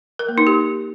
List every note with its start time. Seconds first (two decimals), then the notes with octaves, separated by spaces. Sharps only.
0.19 A#4
0.28 A#3
0.38 D#4
0.47 G4